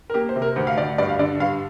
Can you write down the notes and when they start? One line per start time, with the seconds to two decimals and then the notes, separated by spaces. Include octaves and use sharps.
0.10 A#4
0.14 A#3 G4
0.29 C5
0.36 C3
0.42 A#4
0.56 D2 C5
0.67 F5
0.78 D2 D5
0.98 G2 D5
1.09 F5
1.19 D3 D5
1.40 G2 F5